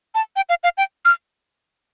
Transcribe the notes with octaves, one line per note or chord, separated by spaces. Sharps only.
A5
G5
F5
F5
G5
F6